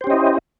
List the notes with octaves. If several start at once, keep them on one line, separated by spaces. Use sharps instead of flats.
C#4 E4 G4 C5 D#5